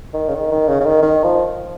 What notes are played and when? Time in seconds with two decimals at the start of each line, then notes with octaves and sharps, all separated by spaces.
0.14 D#3
0.29 C#3
0.35 D#3
0.52 D#3
0.68 C#3
0.80 C#3
0.85 D#3
1.02 D#3
1.24 F3